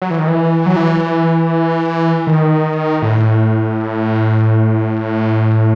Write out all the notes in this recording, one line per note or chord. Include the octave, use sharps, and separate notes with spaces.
F#3
E3
D#3
E3
F#3
E3
D#3
A2